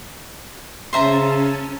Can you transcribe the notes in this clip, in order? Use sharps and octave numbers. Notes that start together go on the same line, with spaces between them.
C#3 C#4 C5 E5 A5 A#5